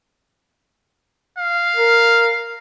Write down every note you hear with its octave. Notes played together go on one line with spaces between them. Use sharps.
F5
A#4